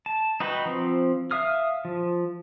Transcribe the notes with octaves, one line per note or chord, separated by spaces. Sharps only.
A5
D#4 F#4 B4 G5 B5
F3 C4
E5 F5 D#6 F6
F3